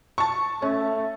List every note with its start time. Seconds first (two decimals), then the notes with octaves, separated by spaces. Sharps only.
0.18 A5 C#6
0.62 A3 C#4